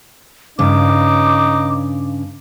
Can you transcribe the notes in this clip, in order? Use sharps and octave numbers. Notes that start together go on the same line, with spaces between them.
G2 C#3 D#4 D6